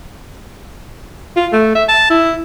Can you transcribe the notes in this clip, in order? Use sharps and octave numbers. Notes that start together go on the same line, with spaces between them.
F4
A3
E5
A5
E4